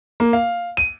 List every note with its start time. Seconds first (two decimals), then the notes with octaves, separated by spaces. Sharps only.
0.20 A#3
0.33 F5
0.77 D#7